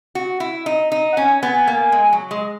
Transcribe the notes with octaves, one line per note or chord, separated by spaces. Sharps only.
F#4
E4
D#4
D#4
F#5
C#4 G#5
B3
A#3
G#3
F#3
G#3